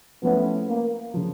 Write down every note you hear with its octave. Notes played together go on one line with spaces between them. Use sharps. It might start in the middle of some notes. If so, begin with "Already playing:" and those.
F3 A3 B3 C#4 E4
A#3
C#3 F3